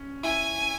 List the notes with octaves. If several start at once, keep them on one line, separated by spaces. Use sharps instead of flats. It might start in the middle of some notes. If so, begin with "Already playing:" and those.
Already playing: C#4
E4 G#5